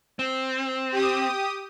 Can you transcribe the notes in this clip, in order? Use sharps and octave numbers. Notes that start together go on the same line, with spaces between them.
C4
G4 D#6